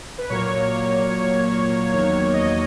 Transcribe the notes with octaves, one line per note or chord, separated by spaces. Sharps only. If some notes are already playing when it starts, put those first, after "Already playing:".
B4
A#2 F#3 A#3 C#5
E2 D#3 F#3 A#3 C#5
D#5